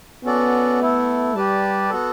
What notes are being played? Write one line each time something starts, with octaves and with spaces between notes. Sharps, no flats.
B3 C#4 F#4 A4 D5
A3 E4 A4
G3 G4 B4 D5 A5
B3 F#4 A4